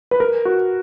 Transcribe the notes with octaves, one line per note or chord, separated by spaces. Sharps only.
B4
A#4
F#4